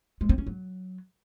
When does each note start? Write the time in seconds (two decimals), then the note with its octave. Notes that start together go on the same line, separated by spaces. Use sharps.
0.21 G#3
0.29 C4
0.38 C#4
0.47 F#3